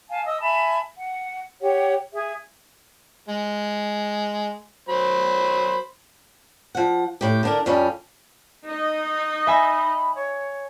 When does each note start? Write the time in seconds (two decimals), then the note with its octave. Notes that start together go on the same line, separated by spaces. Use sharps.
0.09 F5 G#5 A5
0.26 D#5 D#6 E6
0.41 E5 G#5 A5 B5
0.97 F#5
1.61 G4 C#5 F#5
2.13 G#4 E5
3.29 G#3
4.89 F#3 C5 B5
6.75 F3 F#5
7.21 A2 G4
7.43 D3 D4 A#4
7.66 F2 G3 C#4
8.66 D#4 D#5
9.47 E5 G#5 B5 A#6
10.15 C#5